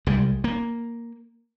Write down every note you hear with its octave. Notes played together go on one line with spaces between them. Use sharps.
C2 G3 G#3
A#3